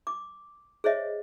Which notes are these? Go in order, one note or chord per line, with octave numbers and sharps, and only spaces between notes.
D6
G#4 C5 C#5 D#5 E5